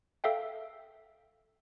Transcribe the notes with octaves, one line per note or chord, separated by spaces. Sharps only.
A4 E5 F5 G5